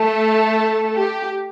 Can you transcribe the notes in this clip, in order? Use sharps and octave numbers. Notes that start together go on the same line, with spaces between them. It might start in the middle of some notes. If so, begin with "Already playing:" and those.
Already playing: A3 A4
G4